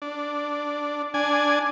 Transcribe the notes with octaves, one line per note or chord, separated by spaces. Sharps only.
D4
D4 G#5